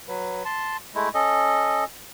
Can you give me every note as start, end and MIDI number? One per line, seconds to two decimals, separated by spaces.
0.08 0.43 54
0.08 0.43 71
0.45 0.77 81
0.45 0.77 84
0.95 1.09 56
0.95 1.09 57
0.95 1.09 64
1.14 1.85 61
1.14 1.85 69
1.14 1.85 75